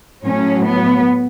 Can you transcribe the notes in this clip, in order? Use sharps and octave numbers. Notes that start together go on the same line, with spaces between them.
A2 F#3 C#4
B3